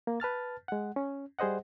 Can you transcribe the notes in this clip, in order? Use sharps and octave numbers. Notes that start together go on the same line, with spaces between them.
A#3
B4 A5 F6 A6
G#3 F#5
C#4
G3 G#4 C5 D#5 F#5